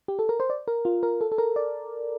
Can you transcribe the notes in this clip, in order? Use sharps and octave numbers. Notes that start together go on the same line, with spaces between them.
G4
A4
A#4
C5
D5
A#4
F4
A#4
A4
A4
A#4
D5